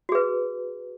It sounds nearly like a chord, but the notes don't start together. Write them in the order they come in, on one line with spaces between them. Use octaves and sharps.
F#4 G#4 B4